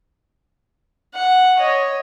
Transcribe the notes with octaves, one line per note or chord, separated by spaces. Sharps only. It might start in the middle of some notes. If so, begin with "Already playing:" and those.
F#5
C#5 D#5